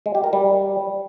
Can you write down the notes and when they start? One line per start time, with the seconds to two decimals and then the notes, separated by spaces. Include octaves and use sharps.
0.06 G#3
0.15 G4
0.24 A#4
0.33 G3